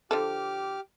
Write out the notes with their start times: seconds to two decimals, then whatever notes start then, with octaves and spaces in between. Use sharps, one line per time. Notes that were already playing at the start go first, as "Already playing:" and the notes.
0.11 D3 F3 G4 A4 D6 F6